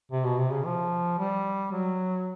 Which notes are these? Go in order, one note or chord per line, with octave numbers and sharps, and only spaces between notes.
C3
B2
C3
C#3
F3
G3
F#3